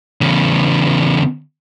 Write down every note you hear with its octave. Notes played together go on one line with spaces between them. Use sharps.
E2 C#3